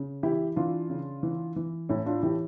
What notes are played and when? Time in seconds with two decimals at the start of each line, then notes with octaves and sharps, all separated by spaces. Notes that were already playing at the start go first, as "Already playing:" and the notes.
Already playing: C#3
0.23 E3 E4 G4
0.56 E3 D4 F4
0.90 C#3
1.23 E3
1.56 E3
1.89 A2 C#4 E4
2.06 D4 F4
2.23 E3 E4 G4